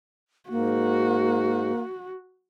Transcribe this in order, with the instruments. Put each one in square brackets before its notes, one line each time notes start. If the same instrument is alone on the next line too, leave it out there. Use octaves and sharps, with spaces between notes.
[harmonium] G#2 [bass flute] A#3 [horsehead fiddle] F#4